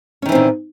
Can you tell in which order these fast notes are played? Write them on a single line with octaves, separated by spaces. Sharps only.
C#4 D#3 E3 C4 A#2